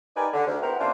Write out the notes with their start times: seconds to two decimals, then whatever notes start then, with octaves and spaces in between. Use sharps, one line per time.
0.16 D#4 G4 A#4 B4 D5 G#5
0.33 D3
0.46 D2
0.61 B3 E4 G4 A#4 C5 F#5
0.78 C3 A#3 C#4 D4 F4 C5